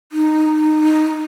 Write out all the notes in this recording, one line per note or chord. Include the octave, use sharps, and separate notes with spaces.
D#4